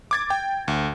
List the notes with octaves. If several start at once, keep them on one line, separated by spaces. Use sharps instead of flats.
D6 G#6 A6
G5
D2